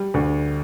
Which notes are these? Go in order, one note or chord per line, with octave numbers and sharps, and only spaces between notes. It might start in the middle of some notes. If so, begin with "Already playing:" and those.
Already playing: G3
D2